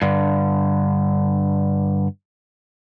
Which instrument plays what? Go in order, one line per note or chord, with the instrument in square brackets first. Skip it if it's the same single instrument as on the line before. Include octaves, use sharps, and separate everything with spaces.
[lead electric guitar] G2 D3